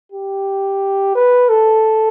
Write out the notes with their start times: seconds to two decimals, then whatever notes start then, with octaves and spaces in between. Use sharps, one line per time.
0.12 G4
1.15 B4
1.49 A4